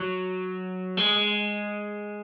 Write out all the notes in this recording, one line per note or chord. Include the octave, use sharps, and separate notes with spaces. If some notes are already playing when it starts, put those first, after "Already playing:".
Already playing: F#3
G#3